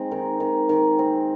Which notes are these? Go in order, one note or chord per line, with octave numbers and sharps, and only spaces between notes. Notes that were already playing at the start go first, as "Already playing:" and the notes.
Already playing: G#3 C4 D#4
D#3
D#3
D#3
C4